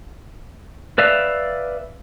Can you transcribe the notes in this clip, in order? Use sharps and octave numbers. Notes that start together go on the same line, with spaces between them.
B4 D5 E5 F5